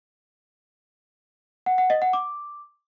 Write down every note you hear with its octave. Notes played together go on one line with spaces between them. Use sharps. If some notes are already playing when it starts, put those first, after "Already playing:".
F#5
F#5
D#5
F#5
D6